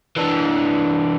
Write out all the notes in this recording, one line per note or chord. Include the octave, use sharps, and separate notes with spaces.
E3 D4